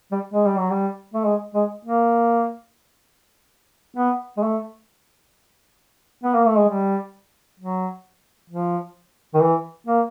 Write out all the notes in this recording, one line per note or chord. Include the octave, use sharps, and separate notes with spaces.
G3
G#3
G3
F#3
G3
A3
G#3
G#3
A#3
B3
G#3
A3
B3
A#3
A3
G#3
G3
F#3
F3
D#3
E3
A#3